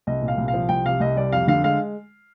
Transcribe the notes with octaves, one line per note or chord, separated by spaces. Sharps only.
C2 D#5
A#2
F5
C2
F5
F3
C2 G5
C3 F5
C2 D#5
G3 D5
F2 F5
D3 F5
G#3 F5